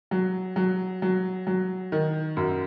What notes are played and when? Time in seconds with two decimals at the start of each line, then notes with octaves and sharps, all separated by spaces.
0.11 F#3
0.56 F#3
1.02 F#3
1.47 F#3
1.92 D#3
2.37 F#2